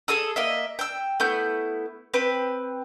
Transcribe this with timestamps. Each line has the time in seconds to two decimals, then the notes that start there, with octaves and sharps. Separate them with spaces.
0.08 G#4 A4 D#6 E6
0.36 A#3 D#5 E5
0.79 G5 E6
1.20 A3 B3 E4 G6
2.14 C4 B4 G5